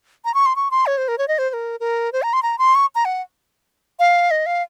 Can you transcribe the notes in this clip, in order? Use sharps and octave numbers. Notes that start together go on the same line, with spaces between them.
A#5
C#6
C6
C#6
C6
C#5
C5
A#4
C#5
D#5
C5
C5
A#4
A#4
C5
A#5
C6
A#5
C6
C#6
A#5
F#5
F5
D#5
F5